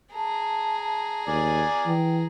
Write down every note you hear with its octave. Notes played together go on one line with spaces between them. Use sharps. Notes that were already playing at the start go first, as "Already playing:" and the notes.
G#4 A5 A#5
D#2 D5 G#5
E3 G5